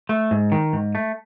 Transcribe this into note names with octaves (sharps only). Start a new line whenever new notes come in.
A3
G#2
D#3
G#2
A3